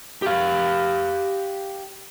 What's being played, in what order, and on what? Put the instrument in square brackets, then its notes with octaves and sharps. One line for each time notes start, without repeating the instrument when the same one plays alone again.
[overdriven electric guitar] G4 F5